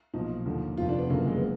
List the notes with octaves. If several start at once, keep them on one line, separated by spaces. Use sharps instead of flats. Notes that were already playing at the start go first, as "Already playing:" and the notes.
B1 A#2 F3 D#4
D#2 D3 F3
F1 F2 F3 F4
D4
B3
F#1 F#2 D3 F3 A#3
G#3
B3